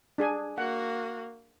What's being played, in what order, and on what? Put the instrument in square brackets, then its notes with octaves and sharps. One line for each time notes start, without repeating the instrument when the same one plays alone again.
[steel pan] D4 G#4 G#5
[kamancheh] A#3 F#4 [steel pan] F#5